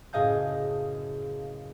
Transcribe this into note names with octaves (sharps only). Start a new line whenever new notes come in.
F#1 A2 G#4 D#5 F5 G6